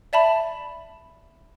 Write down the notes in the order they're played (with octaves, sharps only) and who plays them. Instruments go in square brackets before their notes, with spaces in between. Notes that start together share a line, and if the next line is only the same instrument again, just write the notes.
[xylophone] D5 E5 A5 B5